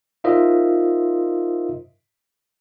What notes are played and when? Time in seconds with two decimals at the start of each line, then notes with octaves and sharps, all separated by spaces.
0.24 D#4 F4 A#4 C5 D#5 E5